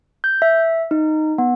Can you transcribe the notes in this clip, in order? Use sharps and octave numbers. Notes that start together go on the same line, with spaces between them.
G6
E5
D#4
B3